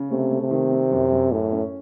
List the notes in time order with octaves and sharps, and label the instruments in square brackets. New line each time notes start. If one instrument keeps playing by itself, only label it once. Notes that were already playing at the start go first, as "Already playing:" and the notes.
Already playing: [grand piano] C#3
[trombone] C3 [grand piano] A3
[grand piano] A3
[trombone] C3
[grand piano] D#3
C4
F#2
F#2
[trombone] A2 [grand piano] C#4
[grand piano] C#4